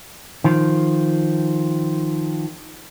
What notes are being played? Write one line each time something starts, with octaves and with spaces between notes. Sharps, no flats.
D#3 F3